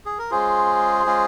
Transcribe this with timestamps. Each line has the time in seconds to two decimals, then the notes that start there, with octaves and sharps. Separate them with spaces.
0.06 G#4
0.18 A#4
0.31 G#3 C#4 F4 G#4 C5
1.06 G#3 C#4 F4